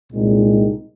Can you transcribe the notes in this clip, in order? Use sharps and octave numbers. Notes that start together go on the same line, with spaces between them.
C2 A#2 G#3 C4 D#4